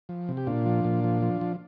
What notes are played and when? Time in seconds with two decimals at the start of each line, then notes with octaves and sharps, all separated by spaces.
0.09 F3
0.29 C3
0.37 G4
0.47 A#2 D4 F4
0.66 F3
0.85 A#2
1.04 F3
1.22 F3
1.41 F3